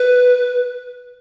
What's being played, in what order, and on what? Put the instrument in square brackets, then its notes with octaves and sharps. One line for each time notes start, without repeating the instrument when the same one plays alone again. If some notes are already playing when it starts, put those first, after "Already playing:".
Already playing: [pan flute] B4